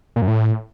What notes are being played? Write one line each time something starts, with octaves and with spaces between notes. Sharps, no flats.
A#2
F#2
A2